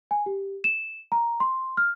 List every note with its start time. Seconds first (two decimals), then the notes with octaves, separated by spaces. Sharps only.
0.11 G#5
0.26 G4
0.64 E7
1.12 A#5
1.40 C6
1.77 F6